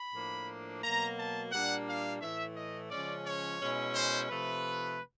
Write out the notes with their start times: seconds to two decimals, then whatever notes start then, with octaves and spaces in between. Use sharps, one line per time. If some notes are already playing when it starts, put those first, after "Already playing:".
Already playing: B5
0.13 A2 F3 A#3 D4
0.83 B2 F#3 A#3 A#5
1.18 A5
1.52 A#2 G3 A#3 D4 F#5
1.88 F5
2.22 A2 E3 A3 E5
2.56 D#5
2.91 C#3 F3 G#3 C#4 D5
3.26 C#5
3.61 B2 G#3 C#4 E4
3.95 C5
4.30 C3 F3 A3 B4